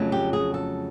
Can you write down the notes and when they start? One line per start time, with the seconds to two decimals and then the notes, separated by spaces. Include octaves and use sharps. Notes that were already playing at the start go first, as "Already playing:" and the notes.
Already playing: F2 C#3 F#3 A3
0.12 G4
0.33 G#4
0.54 A4